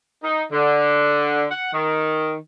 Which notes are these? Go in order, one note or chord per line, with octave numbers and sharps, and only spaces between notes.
D#4
D3
F#5
D#3